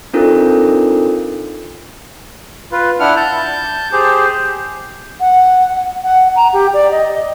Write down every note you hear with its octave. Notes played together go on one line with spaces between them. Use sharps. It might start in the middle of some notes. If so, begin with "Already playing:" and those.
C4 D4 D#4 F4 A4 A#4
F4 B4
D4 E4 F#5 F6
A5 G6
G4 G#4 C5
F#5
F#5
A#5
G4
D5
D#5